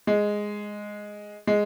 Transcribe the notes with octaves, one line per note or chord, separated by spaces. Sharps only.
G#3
G#3